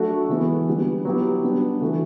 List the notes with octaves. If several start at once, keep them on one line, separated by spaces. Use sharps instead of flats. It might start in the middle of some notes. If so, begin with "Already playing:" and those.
Already playing: F#3 A3 D4 F#4 A4
E3 G#3 B3
D3 G3 B3
F#3 B3 E4 G4
G3 B3 D4
E3 A3 D4 F#4